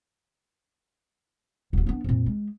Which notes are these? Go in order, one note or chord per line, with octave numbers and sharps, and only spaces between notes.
D#1 F#3
B3 D4
F2 A#2
G#3